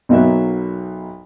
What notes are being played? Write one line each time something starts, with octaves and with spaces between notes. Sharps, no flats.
B1 B2 F#3 A#3 E5